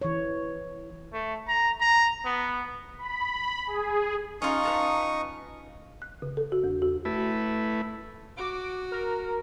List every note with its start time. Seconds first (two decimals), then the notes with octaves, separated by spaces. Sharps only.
0.02 E3 C#5
1.13 A3
1.48 A#5
1.81 A#5
2.25 B3
2.98 B5
3.67 G#4
4.42 C#4 D#4 F4 C#6 D#6
4.63 B4 A5 A#5
6.02 F#6
6.22 C#3
6.37 A4
6.52 F#4
6.64 E2
6.82 F#4
7.05 A3 E4 B4
8.37 F#4 D6
8.92 A#4